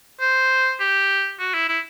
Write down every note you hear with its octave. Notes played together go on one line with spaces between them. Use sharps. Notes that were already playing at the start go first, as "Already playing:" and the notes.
C5
G4
F#4
E4
E4